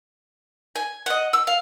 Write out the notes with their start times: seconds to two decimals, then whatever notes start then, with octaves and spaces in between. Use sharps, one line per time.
0.76 G#5
1.06 D#5 F#5
1.33 E6
1.47 F5